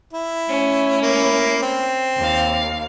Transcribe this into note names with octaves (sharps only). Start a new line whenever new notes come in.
E4
A3 C#4
A#3 E4
C4
D#2 F5